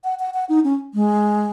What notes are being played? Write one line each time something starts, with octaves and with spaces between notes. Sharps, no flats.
F#5
F#5
F#5
D#4
C#4
G#3